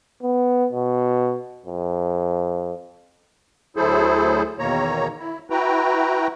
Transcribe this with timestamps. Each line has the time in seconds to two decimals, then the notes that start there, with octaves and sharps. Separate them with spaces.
0.22 B3
0.72 B2
1.66 F2
3.76 D2 F#3 E4 G#4 A4 C5
4.59 E2 B2 D#3 A#3 C#5 A#5
5.19 E4
5.50 E4 F#4 B4 G5 A#5